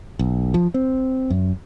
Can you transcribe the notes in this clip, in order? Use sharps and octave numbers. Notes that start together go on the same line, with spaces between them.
B1
F3
C4
F#2